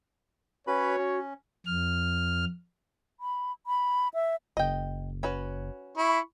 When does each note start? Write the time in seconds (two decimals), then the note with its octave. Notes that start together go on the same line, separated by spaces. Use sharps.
0.67 C#4 F#4 B4 C#5 B5
0.98 C#4
1.66 F2 F6
3.20 B5
3.67 B5
4.14 E5
4.57 F#1 D#5 G5
5.23 C#4 F#4 B4
5.97 E4 B5 C#6